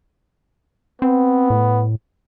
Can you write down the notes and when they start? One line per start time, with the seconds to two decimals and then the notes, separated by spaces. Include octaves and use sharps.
1.02 B3 C4
1.50 A2